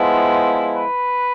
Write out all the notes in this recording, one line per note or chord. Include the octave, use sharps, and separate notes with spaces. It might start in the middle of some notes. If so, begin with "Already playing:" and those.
Already playing: F3 G#3 B3 E4
B4